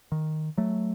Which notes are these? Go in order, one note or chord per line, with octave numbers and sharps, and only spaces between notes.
D#3
F#3 A3